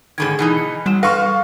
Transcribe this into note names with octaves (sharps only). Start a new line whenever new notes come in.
G#2 D3 D#3 G#4 B5 G#6
B2 E3 D#4
C#7
F#3 G3 E7
A4 B4 F5 C6 C#6 F6 A#6